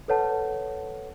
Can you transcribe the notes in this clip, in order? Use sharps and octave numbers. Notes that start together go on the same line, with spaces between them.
A4 B4 C#5 F#5 A5